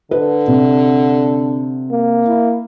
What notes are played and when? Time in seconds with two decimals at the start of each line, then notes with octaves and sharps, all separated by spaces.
0.11 D3 B4
0.48 C3
1.91 A#3
2.26 E4